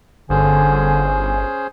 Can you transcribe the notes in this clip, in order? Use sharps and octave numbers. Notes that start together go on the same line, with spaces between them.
G1 D3 C#4 G#4 C5 G#5